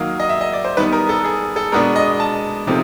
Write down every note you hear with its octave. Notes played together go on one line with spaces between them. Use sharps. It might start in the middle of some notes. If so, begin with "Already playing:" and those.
Already playing: D#3 F#3 A#3 D#4 F5
D#5
E5
D#5
D5
C5
D#3 G3 B3 D#4 B4
A#4
A4
G#4
A4
B2 G#3 B3 D4 A#4
D#5
A5
C3 F3 A3 C4 D#4